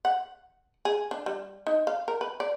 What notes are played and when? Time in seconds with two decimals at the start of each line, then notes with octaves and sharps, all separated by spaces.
0.05 F#5
0.85 G#4
1.11 D4
1.26 G3
1.67 D#4
1.87 F5
2.08 A#4
2.21 B4
2.40 D5